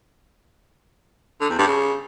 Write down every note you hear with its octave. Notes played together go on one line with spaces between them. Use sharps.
D3
E2
G2
C#3